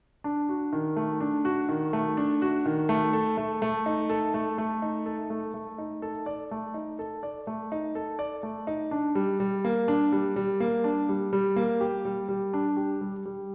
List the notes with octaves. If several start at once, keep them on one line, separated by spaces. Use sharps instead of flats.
D4
F#4
D#3
A3
D4
F#4
D#3
A3
D4
F#4
D#3
A3
A4
A3
A3
D#4
A4
A3
A3
D#4
A4
A3
A3
D#4
A4
D5
A3
D#4
A4
D5
A3
D#4
A4
D5
A3
D#4
D4
G3
G3
A#3
D4
G3
G3
A#3
D4
G3
G3
A#3
G4
G3
G3
D4
G4
G3
G3